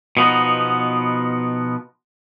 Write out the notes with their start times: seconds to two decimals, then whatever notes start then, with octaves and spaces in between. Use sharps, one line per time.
0.17 B2 F3 B3 D#4